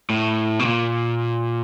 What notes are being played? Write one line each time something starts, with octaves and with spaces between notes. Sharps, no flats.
A2
B2
A#2